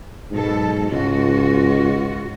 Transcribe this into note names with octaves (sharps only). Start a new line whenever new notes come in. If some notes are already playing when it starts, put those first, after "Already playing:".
G#2 B2 F#3 A4
C#2 G#2 F4 F#4